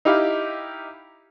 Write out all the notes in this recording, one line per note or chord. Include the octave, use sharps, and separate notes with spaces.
D#4 E4 G4 F5